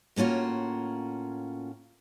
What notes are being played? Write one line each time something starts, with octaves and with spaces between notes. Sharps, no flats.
A2 A#3 C#4 F4 F#4